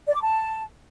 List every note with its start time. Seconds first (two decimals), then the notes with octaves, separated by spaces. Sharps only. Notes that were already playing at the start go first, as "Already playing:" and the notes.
0.07 D5
0.14 D6
0.22 A5